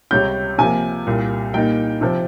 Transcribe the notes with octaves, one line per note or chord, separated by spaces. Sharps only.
C#2 C3 G3 C#4 G6
C3 F3 A#3 G#5
C2 A#2 G3
A#2 G3 A#3 D#4 G5
C3 F3 C4